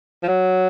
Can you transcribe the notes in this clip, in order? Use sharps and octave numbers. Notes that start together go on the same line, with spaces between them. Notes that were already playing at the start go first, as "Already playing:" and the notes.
F3
F#3